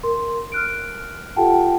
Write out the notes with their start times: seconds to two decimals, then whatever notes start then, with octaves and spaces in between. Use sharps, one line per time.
0.03 A#4 C6
0.52 F6 F#6 D7
1.36 F4 G4 A4 F#5 G5 A5